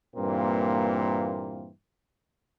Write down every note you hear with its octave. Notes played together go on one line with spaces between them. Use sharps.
G2 A#2 E3 A#3 C4